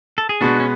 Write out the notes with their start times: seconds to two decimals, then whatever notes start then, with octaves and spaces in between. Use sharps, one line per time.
0.18 A4
0.29 G#4
0.41 B2 G#3 B3 D4 F#4
0.60 C#4